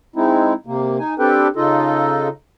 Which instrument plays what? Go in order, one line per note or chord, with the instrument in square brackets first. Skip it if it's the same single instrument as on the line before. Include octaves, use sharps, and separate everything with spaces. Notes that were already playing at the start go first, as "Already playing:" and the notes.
[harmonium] G#3 C4 D#4 E4
C3 A#3
D#4 G#5
C4 D4 G4 A4 B4 G5
C#3 D#4 F4 A4 D#5